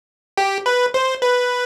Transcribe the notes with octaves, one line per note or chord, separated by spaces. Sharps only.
G4
B4
C5
B4